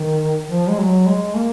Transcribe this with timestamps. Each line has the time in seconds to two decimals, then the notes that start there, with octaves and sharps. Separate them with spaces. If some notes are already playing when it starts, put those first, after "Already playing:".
Already playing: D#3
0.51 F3
0.69 G#3
0.79 F#3
1.07 G#3
1.35 A#3